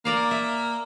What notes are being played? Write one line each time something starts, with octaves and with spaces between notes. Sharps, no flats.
A#3 A#4 D5 F5
E5